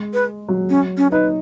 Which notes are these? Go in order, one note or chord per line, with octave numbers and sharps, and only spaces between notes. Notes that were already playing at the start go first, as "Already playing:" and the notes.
Already playing: G#3
B4
F#3
C#4
C#4
D#4 B4